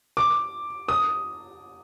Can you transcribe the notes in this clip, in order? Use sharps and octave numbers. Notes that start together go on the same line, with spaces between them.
D6
D#6